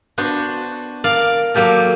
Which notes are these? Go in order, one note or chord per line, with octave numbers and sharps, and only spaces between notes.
B3 D4 F#4 C5
A#4 D5 F5
F#3 A#3 G4 A4